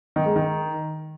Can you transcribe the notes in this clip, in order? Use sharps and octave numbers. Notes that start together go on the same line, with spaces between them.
D#3
G#3
D#3